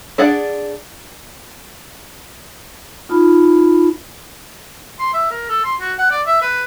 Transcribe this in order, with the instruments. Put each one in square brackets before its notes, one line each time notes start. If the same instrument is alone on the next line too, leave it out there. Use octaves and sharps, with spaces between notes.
[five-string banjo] D4 G#4 D5 F#5
[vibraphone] D#4 F4 A5 B5
[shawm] C6
E5
A#4
A4
C6
F#4
F#5
D5
E5
B4